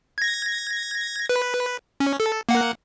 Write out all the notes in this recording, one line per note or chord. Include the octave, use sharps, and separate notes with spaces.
G#6 A#6
B4
C#4
A4
A#3 F#5